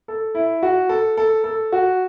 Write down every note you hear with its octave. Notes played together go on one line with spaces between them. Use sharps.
A4
E4
F#4
A4
A4
A4
F#4